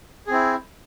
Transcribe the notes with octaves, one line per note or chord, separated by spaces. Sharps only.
C4 E4 G#4